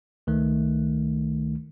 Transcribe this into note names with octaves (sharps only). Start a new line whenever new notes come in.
C#2 D#3 A3